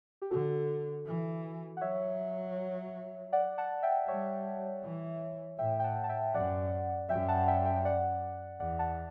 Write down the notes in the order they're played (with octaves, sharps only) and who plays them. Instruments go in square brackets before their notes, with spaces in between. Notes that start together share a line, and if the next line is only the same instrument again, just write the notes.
[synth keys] G4
[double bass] D3 [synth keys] F#4 A4
[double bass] E3
[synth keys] F#5
[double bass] F#3 [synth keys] C#5 E5
[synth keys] D5 F#5
F#5 A5
E5 G5
[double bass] G3 [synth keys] C#5 E5
[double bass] E3
[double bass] A2 [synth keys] E5 G5
[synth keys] G5
F#5 A5
A5
E5 G5
[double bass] F#2 [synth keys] D5 F#5
[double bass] F#2 [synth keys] E5 G5
[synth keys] F#5 A5
E5 G5
E5 G5
G5
D5 F#5
[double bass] E2 [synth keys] D5 F#5
[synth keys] F#5 A5